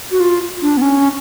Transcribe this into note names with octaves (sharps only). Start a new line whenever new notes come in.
F#4
F4
D4
B3
C#4